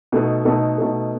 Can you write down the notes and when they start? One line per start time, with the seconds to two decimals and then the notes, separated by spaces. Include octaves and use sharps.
0.12 B2 A3 D#4 A4
0.45 B2 A3 D#4 A4
0.78 B2 A3 D#4 A4